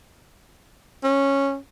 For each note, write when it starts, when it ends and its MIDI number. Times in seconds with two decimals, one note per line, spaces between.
1.04 1.57 61